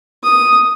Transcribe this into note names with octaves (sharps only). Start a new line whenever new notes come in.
D#6